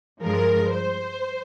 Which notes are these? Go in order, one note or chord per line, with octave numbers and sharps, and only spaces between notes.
G2 F3 G#3 A#4
C5